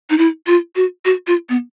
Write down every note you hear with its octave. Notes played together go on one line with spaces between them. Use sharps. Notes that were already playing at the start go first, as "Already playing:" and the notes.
D#4
E4
F4
F#4
F#4
F4
B3